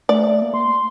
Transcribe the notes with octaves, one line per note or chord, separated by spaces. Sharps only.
A3 D5
A#3
C6